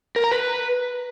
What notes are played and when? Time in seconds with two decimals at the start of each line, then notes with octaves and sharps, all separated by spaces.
0.16 A#4
0.24 A#5
0.31 B4